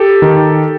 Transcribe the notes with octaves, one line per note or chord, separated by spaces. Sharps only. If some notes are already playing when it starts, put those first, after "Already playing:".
Already playing: G4 A4
D#3